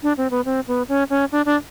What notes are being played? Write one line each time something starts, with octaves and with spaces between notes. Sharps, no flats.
D4
C4
B3
C4
B3
C#4
C#4
D4
D4